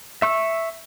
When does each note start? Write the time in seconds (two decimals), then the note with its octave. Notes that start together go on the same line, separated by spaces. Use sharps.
0.22 E5 C#6 E6